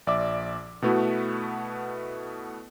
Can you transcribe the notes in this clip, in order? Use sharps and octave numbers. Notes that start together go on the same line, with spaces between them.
A#1 D5 E5 D6
B2 A3 B3 E4 F#4